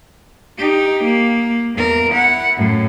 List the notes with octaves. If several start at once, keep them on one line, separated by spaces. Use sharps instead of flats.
D#4 G4
A#3
E2 A#4
E4 F#5
F#2 A2